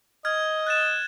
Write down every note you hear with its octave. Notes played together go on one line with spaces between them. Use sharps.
D#5 F6 G#6
F#6 A6 E7